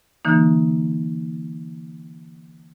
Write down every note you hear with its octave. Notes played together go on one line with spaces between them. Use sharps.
D3 E3 A#3 D#4